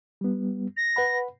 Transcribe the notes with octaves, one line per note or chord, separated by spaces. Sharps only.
G3 B3
A#6
B4 F#5 B5